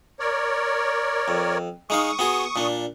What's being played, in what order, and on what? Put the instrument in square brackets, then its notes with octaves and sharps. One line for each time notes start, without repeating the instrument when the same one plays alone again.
[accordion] A#4 C#5 D5
[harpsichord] F2
[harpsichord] G#3 D#4 F5 [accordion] C#6 D#6
[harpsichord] B3 F#4 G#4
A#2 D4